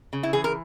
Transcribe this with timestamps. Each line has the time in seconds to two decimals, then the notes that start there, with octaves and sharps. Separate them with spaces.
0.13 C#3
0.23 E4
0.33 E3 G#4
0.44 A#4